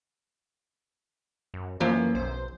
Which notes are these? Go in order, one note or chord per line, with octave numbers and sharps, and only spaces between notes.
F#2
F#2 E3 F3 A#3
B1 C5